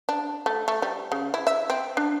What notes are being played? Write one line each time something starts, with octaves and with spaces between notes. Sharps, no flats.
D4
A3
A3
G3
C#3
E4
E5
C4
D4